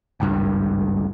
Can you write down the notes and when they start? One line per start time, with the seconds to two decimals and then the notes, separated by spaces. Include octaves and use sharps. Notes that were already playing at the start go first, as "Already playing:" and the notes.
0.20 G#1 C#2 G2